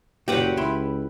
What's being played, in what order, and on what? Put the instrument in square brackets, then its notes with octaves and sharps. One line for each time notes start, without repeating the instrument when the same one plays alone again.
[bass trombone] F#1 [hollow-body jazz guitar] A#2 F#3 [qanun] G4 B4 F#5
[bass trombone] C#2 [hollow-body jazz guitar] E4 C6